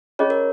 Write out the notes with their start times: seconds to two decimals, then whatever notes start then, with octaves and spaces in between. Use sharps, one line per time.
0.19 C#4 F4 G#4 C#5 D#5
0.30 A#4